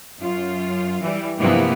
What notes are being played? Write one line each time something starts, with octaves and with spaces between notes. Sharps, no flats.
F#2 F4
E3 G3
G2 C3 E3 F3 A#3 B3